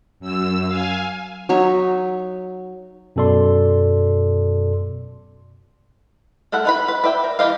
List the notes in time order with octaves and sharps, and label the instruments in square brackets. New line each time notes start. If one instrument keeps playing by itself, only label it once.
[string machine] F#2 E6
F5 G#5
[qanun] F#3 D#4 C#5 E5
[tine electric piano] F#2 B2 A4 D5 C6
[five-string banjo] A3 A4 A#4 F#5
D#4 B4 B5
B4
B4 D5 E5 G5
A#4
E3 G4 D#5 F5